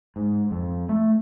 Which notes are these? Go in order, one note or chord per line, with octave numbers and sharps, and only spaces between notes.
G#2
F2
A3